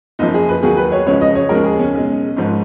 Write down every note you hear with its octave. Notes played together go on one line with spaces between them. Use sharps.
F#1 F#2 F3 D#4
G#4
B4
D#2 D#3 F#3 G#4
B4
C#5
C#2 C#3 F3 G#3 C#5
D#5
C#5
D#2 C#3 F3 G#3 A#4
G#4
C#4
B1 B2 G#3
G#1 G#2 F3 G#3